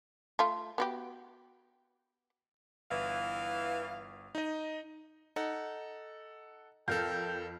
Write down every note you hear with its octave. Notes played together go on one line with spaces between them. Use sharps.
A3 F4
B3 F#4 G4
G1 E3 F5
D#4 D#5
D#4 A4 F#5
F2 A4 A#4 F5 G5 F6 G6